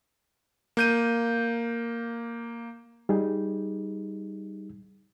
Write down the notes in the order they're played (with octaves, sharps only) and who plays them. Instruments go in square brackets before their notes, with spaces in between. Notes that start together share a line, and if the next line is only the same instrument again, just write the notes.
[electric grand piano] A#3 G6 D#7
[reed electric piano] G3 D#4 G#4